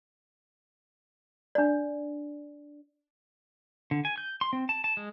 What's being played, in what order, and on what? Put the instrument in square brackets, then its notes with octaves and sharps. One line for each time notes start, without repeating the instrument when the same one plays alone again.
[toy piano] D4 D5
[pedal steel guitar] D3
G#5
G6
C6
C4
A5
A5
G#3